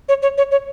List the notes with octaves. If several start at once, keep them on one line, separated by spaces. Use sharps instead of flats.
C#5
C#5
C#5
C#5